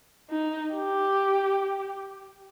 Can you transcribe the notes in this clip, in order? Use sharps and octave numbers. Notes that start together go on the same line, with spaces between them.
D#4
G4